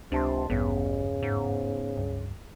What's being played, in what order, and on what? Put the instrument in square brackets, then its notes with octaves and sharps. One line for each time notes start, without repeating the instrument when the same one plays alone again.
[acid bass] C#2 [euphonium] C3 [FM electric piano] D4 A5 C6
[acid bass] A1 [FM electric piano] E2 G2 B3 [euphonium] C#3
[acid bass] G#2
[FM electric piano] C#2 G2